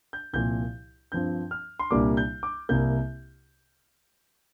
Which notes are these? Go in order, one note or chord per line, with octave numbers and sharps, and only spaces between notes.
G6
C2 A#2 F3 G6
G2 F3 C4 G6
F6
C6
C2 A#2 G3 A#3 D4 D6
G6
D6
C2 C3 A#3 G6